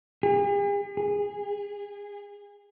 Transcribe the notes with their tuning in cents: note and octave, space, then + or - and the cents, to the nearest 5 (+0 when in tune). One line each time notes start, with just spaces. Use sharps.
G#4 -45
G#4 -25